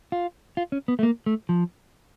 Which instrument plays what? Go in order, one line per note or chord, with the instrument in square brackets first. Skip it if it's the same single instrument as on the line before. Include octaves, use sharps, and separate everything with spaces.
[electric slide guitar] F4
F4
C#4
B3
A3
A#3
A3
F3